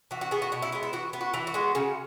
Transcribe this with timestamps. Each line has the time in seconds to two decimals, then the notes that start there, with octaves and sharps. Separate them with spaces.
0.11 E3 F#4
0.21 F#4
0.31 B3 G#4
0.42 F#4
0.52 B2 F#4
0.62 E4
0.72 G#3 B3 E4
0.83 E4
0.93 E3 F#4
1.13 B3
1.21 F#4
1.34 E3 E4
1.47 F#4
1.54 G#3 B3
1.75 C#3